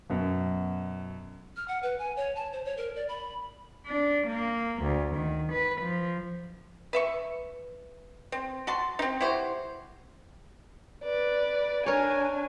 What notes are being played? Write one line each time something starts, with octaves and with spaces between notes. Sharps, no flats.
F#2 B2
F6
F#5
B4
G#5
C#5
A5
C5
C#5
A#4
D5
B5
D4
A#3
D2
D#3
B4
F3
B4 E5 C#6
C4
F#4 A5 C6
C4 D#4
E4 F#4 G4 C5
B4 D5
D4 A#4 C#5 G#5